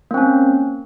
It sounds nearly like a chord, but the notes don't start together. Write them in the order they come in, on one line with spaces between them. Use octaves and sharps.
A#3 C4 C#4